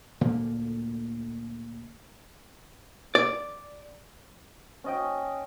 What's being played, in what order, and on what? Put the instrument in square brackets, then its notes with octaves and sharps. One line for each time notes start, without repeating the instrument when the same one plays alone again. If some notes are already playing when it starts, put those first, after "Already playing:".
[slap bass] D2 A#2 D3 A#3
[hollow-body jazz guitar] D5
[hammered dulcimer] C#4 D#5 G5